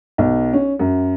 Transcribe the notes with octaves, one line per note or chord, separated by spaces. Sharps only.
B1
C#4
F#2